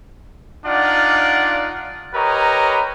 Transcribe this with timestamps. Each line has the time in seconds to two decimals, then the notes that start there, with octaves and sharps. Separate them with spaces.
0.66 D4 D#4 F4 D5 F5 F#5
2.14 G4 A#4 B4 C#5 D#5 A#5